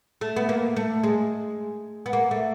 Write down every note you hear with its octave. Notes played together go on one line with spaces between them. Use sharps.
A3
B3
A#3
A3
G#3
B3
A#3
A3